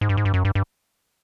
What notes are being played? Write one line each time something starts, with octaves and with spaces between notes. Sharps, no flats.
G#2
G2
G#2
G2
F#2
G2
G2